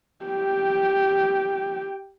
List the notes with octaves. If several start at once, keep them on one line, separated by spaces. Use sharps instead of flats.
G4 G5